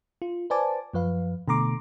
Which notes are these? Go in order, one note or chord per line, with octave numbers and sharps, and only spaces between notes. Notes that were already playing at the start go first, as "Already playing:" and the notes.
F4
B4 C5 D5 G#5 A5 D6
F#2 F3 B4 F5
B2 D3 A3 A#5 C6 D6